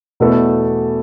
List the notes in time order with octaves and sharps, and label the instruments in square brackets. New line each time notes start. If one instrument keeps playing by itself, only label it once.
[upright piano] E2 B2 A3 E4 A4